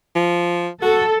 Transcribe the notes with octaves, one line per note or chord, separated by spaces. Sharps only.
F3
F#4 A4